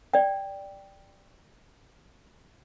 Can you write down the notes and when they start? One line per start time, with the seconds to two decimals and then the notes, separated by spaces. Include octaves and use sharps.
0.13 D5 G5